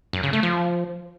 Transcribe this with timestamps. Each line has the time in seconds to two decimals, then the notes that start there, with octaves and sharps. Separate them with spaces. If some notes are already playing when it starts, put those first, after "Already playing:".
0.13 F#2
0.23 C#3
0.33 A3
0.43 F3